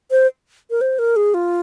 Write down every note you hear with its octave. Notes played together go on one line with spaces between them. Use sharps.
C5
A#4
C5
A#4
G#4
F4